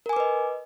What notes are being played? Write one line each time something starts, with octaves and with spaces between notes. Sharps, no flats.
A#4 B4 D#5 G#5 D6